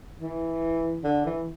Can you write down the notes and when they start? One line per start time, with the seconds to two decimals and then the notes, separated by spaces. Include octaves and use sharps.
0.20 E3
1.04 D3
1.26 E3